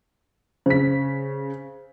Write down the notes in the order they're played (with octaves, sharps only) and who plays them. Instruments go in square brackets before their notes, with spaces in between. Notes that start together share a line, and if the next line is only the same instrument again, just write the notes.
[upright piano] C#3 B6 [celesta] C5